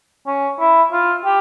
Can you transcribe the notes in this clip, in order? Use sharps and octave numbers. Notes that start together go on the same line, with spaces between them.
C#4
E4
F4
G4